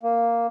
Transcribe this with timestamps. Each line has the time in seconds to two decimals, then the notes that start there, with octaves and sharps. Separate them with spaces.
0.03 A#3